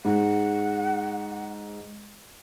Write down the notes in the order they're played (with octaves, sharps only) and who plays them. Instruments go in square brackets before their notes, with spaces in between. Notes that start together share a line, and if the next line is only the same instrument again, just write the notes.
[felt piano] G#2 [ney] F#5